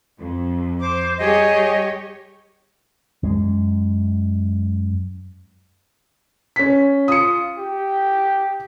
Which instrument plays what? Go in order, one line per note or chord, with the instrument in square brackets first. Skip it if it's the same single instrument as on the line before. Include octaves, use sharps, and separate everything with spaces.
[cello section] F2
[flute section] C5 D6
[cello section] G3 G4 C#5 [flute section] G#4 D#5
[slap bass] F#2 G#3
[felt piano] C#4 B6
[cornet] F4 [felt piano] D#6 C#7
[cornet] G4